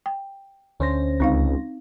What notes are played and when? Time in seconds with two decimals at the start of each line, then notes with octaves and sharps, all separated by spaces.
0.06 G5
0.80 D2 C#4 C5 A#6
1.20 C#2 C4 D#4 F5